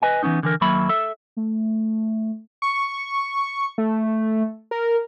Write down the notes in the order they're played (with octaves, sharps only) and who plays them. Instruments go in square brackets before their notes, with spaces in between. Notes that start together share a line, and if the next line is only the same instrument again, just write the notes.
[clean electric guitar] B4 D#5 G#5
E3 G#3 B3 C#4 D#4
D3 E3 A#4
D#2 F#3 A#3 E5 B5
A4 E5
[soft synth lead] A3
[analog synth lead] C#6
A3
A#4